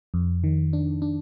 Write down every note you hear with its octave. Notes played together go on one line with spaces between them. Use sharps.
F2
D#3
D4
D4